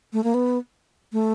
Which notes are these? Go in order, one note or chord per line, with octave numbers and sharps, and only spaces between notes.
A3
A#3
B3
A3